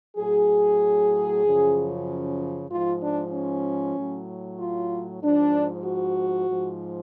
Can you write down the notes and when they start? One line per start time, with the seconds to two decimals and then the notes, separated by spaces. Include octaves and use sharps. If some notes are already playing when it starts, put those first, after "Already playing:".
0.17 A2 F#3 G#4
1.44 F#2 C#3 F3
2.70 G#2 F3 F4
3.02 D4
3.33 C#4
3.96 A2 F#3
4.60 F4
5.22 G#2 F3 D4
5.85 F#4
6.48 G#2 F3